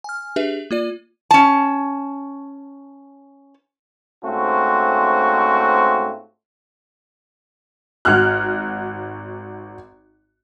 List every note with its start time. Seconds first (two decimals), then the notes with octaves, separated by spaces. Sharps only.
0.04 G#5 F6
0.36 D4 G4 G#4 B4 E5
0.71 A#3 F4 D5 D#7
1.31 C#4 A5
4.23 G#2 A3 C4 C#4 F4 F#4
8.05 G#1 F#4 F6 F#6